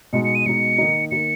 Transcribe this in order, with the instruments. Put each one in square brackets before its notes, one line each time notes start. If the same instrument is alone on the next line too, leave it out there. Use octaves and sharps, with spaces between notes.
[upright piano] B2 G#3 D#4 [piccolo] C#7
[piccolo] C#7
D#7
[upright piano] B2 G#3 D#4 [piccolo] C#7
[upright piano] D#3 A#3 D#4
[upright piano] D#3 A#3 D#4 [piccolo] C#7